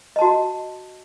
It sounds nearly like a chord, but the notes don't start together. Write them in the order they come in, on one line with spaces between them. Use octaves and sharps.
D#5 A5 F#4